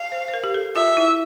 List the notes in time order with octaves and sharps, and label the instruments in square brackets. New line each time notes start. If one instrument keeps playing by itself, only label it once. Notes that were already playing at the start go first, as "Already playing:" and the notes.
Already playing: [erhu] F5
[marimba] C5
C5
A#4
G4
A4
[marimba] F4 [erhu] E5
[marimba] E4